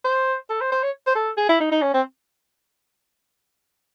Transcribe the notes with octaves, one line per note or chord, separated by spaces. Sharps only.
C5
A4
C5
C5
C#5
C5
A4
G#4
E4
D#4
D#4
C#4
C4